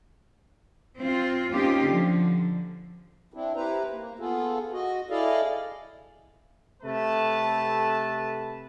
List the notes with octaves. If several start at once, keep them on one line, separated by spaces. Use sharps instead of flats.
C4 F4
A#3 C4 C#4 D#4 F4 G4
D3 F3
C4 D4 E4
E4 G4 B4 C5 A#5
A#3
B3 F4 G#4 A4
F#4 D#5
E4 G#4 A4 D5 D#5 F5
C3 A3 G4 A4 B4 A5